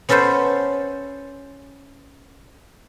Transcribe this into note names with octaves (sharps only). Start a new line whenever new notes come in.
B3 C#4 A4 B4 C5